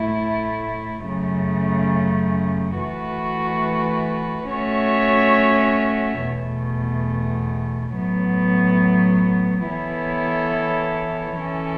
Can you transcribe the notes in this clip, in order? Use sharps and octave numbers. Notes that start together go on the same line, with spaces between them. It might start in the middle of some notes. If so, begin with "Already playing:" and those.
Already playing: A2 A3 E4
F#2 C#3 A3
E3 A3 F#4 B4
A3 C#4 F#4 C#5 E5
E2 B2 A3
A2 F#3 B3
E3 B3 E4 A4 C#5
E3 C#4 A4